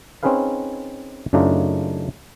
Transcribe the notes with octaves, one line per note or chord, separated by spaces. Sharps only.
C4 C#4 D#4 G#4 B4 F5
F#2 C#3 A3 D4 D#4 F4